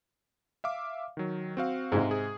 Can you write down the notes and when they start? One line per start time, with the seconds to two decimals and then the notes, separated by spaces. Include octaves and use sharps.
0.64 E5 F5 D6
1.17 D#3 F#3
1.57 C4 F#4 F5
1.92 G#2 C3 G#3
2.11 G#4